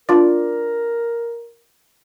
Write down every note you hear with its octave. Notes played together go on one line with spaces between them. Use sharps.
D4 F4 A#4 D5